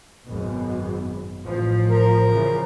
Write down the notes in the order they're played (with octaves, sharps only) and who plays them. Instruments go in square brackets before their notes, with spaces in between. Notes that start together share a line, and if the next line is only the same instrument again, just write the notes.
[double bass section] G#1 F#2 B2
A1 F3
[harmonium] A#4
[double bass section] C#3 E3 F3